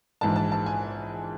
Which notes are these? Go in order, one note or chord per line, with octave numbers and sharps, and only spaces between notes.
A#1 G#2 E3 G#3 A5
A5
A5
G#5